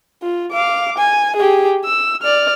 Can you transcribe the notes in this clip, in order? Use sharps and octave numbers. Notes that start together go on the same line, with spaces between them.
F4
F5 D6
G#5
G4 G#4
E6
D5 F6